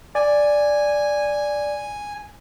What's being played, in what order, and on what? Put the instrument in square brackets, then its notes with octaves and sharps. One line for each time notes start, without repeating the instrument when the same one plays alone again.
[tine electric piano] D5 [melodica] G#5